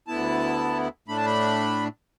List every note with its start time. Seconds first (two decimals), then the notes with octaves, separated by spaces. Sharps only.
0.07 D2 D3 B3 E4 A5
1.08 A2 A3 D4 B5
1.17 A5
1.26 B5